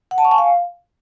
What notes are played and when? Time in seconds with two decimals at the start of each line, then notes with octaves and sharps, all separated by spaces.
0.11 F#5
0.18 A5
0.25 C#6
0.31 G#5
0.38 F5